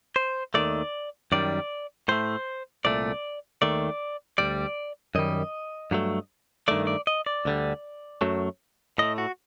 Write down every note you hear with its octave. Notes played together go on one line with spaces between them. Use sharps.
C5
D#2 D#3 F#3 A3 D5
F#2 D#3 G3 D5
A2 A3 C5
C2 A#2 A3 D5
D#2 D#3 A3 D5
D2 C3 G3 D5
F#2 D#3 G3 D#5
G2 F#3 A3
G2 D#3 A3 D5
D5
D#5
D5
D2 D3 G3
F#2 F#3 A3
A2 A3 D#5
F#4